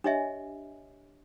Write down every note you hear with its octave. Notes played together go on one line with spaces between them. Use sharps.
D4 G4 C#5 D#5 E5 G#5